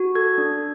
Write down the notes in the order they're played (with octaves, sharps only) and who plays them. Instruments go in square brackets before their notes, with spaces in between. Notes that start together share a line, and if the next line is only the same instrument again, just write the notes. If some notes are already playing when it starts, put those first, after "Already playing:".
Already playing: [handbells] F#4
A4 G#6
D4